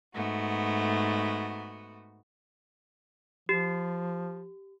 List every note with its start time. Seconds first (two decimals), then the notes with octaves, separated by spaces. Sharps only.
0.14 G#2 A3 B3 F#4
3.49 F3 G4